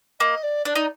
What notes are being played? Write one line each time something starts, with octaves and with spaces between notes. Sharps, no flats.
A#3 D#5
D5
D4 D5
D#4